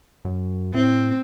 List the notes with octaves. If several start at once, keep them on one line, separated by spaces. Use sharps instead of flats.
F#2
A2 C4